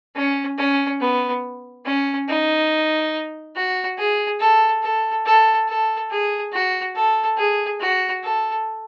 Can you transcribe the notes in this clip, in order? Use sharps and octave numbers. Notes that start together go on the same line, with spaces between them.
C#4
C#4
B3
C#4
D#4
F#4
G#4
A4
A4
A4
A4
G#4
F#4
A4
G#4
F#4
A4